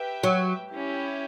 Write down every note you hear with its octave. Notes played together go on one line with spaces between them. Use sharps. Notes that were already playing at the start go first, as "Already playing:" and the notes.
Already playing: G4 B4 E5 G5
F#3
C#4 E4 G4